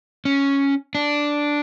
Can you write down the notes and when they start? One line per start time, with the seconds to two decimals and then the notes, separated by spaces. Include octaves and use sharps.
0.25 C#4
0.95 D4